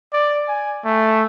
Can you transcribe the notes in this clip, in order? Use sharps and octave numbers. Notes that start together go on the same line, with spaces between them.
D5
G#5
A3